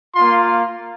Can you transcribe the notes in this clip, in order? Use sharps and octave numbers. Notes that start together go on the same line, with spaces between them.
A#3 F4 C6